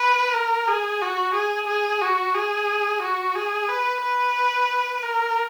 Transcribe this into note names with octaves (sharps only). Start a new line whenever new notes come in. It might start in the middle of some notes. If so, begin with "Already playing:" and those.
Already playing: B4
A#4
G#4
F#4
G#4
G#4
F#4
G#4
F#4
G#4
B4
B4
A#4